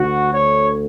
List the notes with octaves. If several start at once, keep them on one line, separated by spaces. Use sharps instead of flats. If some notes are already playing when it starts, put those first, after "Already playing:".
Already playing: D2 D3 F#4
C#5